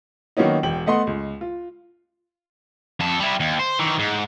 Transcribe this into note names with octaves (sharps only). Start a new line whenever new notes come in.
D#3 F#3 A#3 B3 C#4 D#4
E1 G5 F#7
A3 B3 D#5 F#5 C6
C#2
F4
F2 A4
G3 E4
D#2
C5
D#3 E3
G#2